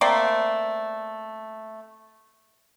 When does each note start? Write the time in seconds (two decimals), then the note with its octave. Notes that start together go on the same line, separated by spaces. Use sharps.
0.01 A3 A#3 C4 D5